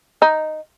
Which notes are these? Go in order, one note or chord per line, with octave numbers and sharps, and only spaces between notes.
D#4